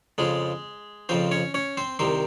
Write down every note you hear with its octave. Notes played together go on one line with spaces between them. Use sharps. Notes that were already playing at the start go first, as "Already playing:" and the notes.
F2 C#3 F3 G#3 G#4
F2 C#3 F3 C4 C5
C#4 C#5
C#4 C#5
C4 C5
C2 C3 D#3 C4 C5